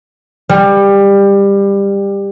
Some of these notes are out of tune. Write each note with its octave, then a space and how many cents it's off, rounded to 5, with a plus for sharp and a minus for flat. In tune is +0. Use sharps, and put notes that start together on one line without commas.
G3 +20